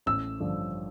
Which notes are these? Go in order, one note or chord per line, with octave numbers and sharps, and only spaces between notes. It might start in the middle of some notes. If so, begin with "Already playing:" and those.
A1 E6
G2 D3 F3